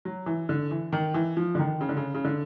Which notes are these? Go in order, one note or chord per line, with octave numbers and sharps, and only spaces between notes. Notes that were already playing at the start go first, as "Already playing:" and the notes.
F#3
E3
D3
E3
D#3
E3
F3
D3
D#3
C#3
D3
C#3
C#3
D3